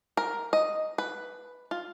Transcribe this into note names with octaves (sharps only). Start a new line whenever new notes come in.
A#4
D#5
B4
F4